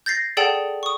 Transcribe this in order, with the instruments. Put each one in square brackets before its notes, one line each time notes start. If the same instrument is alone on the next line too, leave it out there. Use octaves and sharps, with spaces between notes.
[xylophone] G6 A6 A#6 C7
G#4 A4 D5 F#5 G5 A5
C#6 D#6